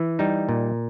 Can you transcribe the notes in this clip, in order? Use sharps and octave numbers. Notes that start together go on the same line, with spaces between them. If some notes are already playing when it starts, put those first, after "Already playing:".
Already playing: E3
G3 D#4
A#2